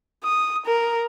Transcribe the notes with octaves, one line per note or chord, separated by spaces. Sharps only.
D#6
A#4